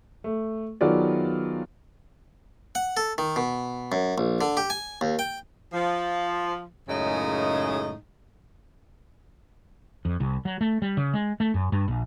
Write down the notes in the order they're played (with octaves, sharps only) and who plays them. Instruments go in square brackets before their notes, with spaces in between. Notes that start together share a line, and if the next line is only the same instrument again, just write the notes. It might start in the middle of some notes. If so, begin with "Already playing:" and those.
[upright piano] A3
D#3 F#3 B3 F4 G#4 D5
[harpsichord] F#5
A4
D#3
B2
F#2
A#1
D3
G4
G#5
D#2
G5
[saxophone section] F3
F#2 A2 C#3 G#3 D#4
[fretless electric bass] F2
C2
F#3
A3
G3
C#3
G#3
A3
F#2
G2
A#1